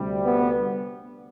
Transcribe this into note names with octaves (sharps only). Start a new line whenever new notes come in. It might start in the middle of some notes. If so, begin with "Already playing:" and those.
Already playing: D2 C3 G3
B3